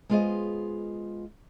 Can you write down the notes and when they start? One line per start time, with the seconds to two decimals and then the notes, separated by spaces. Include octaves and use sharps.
0.09 G#3 B3 F4 G#4 C5 D#5